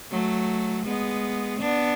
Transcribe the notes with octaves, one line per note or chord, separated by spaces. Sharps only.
F#3 A3
G#3 B3
B3 D4